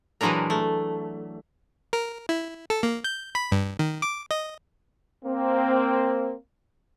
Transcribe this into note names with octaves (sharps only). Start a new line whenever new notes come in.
A#2 E3 F#3 G#3 D4 A#4
A3
A#4
E4
A4
A#3
G6
B5
G2
D#3
D6
D#5
A#3 C4